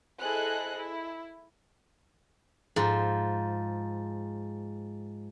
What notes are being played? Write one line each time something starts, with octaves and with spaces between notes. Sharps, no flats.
E4 G#4 A4 C5 D#5 F#6
E4
G#2 F3